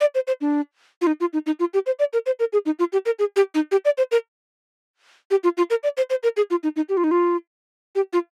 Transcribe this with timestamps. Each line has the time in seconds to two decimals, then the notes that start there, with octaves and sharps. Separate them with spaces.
0.01 D5
0.15 C5
0.27 C5
0.41 D4
1.01 F4
1.07 D#4
1.21 F4
1.33 D#4
1.46 D#4
1.60 F4
1.74 G4
1.86 C5
1.99 D5
2.13 A#4
2.26 C5
2.40 A#4
2.53 G#4
2.66 D#4
2.79 F4
2.93 G4
3.06 A#4
3.19 G#4
3.36 G4
3.55 D#4
3.72 G4
3.85 D5
3.98 C5
4.12 A#4
5.31 G4
5.44 F4
5.57 F4
5.70 A#4
5.83 D5
5.97 C5
6.10 C5
6.23 A#4
6.37 G#4
6.51 F4
6.63 D#4
6.76 D#4
6.89 G4
6.97 F4
7.04 D#4
7.11 F4
7.95 G4
8.13 F4